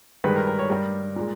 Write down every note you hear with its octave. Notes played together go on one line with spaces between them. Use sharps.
G2 D#3 G#3 B4
A#4
A#4
C#5
G2 G3 A#4
A#2 G#3